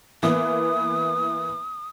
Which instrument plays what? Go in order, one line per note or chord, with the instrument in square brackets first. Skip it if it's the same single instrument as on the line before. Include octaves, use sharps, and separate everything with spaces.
[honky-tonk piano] E3 A#3 B3 [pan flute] D#6